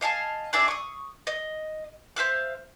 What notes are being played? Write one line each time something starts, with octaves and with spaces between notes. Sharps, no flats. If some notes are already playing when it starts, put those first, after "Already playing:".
D#5 F5 G#5 A5
D4 G#4 D5 E5
C#6 D#6
D#5
C5 E5 F5 F#6